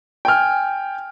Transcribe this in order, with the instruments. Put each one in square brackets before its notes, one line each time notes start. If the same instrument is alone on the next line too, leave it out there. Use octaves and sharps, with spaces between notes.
[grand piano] G5 G#5 F6